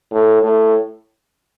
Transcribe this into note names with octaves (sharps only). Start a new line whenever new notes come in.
A2
A2